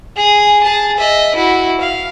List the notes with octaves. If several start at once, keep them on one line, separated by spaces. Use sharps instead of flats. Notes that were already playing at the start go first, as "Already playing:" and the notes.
G#4 D#6
G#4 A5
D#5 E5
E4 F#4
F5